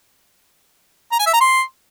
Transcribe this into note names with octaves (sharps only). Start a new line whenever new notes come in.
A#5
G#5
E5
A#5
C6